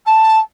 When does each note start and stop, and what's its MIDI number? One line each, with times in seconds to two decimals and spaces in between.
0.06 0.38 81